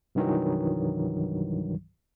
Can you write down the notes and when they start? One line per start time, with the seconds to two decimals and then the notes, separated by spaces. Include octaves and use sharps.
0.15 C2 G2 D#3 E3 F#3